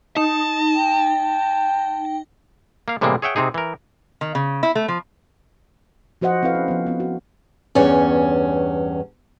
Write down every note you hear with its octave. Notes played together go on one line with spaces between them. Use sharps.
D#4 A5
G5
A#3 F5
A2 C3 E3 G3 G#3 A#3
G#4 C#5 E5 F#5 G5
C3 C4 D#4 G#4
E3 A#4
D#3
C#3
E4
A3
F3
F3 F#4 C5 D#5 F#5
C4 E4 A4 B4 F5
C#4
F3 B3
B3 C4
F#4
E2 G2 C#4 C#5